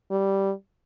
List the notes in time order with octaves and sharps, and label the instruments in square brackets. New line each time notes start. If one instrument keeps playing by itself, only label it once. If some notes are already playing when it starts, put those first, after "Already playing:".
[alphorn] G3